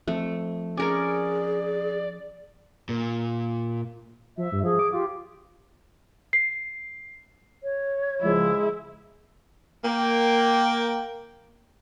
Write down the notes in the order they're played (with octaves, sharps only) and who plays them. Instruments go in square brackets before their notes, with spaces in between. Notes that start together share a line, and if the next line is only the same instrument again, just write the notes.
[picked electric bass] F3 C4 [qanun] A3
[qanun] C#4 A#4 C#5 [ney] G#4 [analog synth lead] D5
[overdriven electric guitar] A#2
[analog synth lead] F3 [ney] E5
[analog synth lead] G2
[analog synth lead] F3 [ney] G#4
[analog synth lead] D6
[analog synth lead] F4 [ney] G4
[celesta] C7
[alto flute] C#5
[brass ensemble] C#2 F3 [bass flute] G#3 [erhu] E4
[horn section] A#3 G5